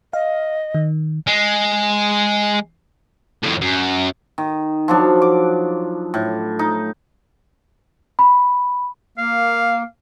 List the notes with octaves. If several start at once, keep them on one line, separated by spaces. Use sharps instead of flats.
D#5 F5
D#3
G#3
F2 A2
F#2
D#3
F3 F#3 D4
D6
A2
D#4
B5
A#3 F5